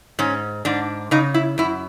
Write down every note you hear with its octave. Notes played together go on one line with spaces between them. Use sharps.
G#2 C#4
G#2 D4
C#3 D#4
E4
F#2 E4